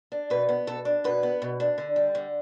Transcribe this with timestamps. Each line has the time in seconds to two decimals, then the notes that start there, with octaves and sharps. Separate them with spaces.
0.12 D4
0.30 B2 B4
0.49 B3
0.67 B2 A4
0.85 D4
1.04 B2 B4
1.23 B3
1.42 B2
1.60 D4
1.78 D3
1.96 G3
2.15 D3